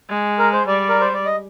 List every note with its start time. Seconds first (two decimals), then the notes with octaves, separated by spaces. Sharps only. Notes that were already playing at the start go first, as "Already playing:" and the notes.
0.10 G#3
0.39 A#4
0.53 C5
0.67 G3 D5
0.89 A#4
1.01 C5
1.14 D5
1.26 D#5